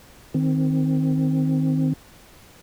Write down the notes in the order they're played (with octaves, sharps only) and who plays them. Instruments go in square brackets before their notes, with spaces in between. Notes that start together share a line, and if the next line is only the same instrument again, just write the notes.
[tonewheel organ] D#3 C4